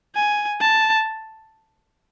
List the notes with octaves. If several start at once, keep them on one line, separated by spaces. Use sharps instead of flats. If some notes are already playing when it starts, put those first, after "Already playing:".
G#5
A5